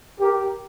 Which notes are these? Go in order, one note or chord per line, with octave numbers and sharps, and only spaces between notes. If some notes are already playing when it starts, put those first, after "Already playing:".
G4 A#4